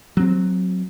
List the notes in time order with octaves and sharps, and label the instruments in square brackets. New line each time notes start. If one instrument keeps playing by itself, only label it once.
[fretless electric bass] F#3 C4